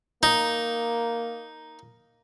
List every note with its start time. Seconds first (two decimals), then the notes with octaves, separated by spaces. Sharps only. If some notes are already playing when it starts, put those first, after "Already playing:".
0.23 A#3 D#4